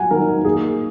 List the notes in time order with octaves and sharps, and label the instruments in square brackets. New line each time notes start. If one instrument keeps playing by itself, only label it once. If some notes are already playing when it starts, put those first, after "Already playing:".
Already playing: [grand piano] F#3 F#5 G#5
D#3 A#4
A#3 G#4